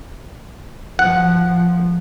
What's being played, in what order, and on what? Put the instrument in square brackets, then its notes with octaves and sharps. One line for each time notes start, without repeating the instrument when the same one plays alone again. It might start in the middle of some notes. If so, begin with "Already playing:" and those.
[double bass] F3 [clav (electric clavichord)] F#5